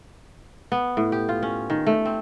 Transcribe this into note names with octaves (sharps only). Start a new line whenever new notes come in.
B3
A2
G4
F4
C#4
D#3
A3
C4